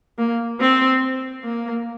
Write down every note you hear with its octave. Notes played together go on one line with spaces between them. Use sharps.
A#3
C4
A#3